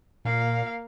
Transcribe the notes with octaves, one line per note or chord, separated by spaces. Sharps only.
A#2 A#3 F5